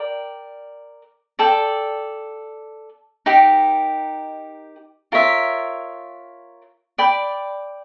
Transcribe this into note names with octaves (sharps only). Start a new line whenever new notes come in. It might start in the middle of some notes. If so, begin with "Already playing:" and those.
Already playing: A#4 D5 G5
A4 D5 G5
D#4 G4 A#4
F4 A#4 C#5 E5
D5 G5 B5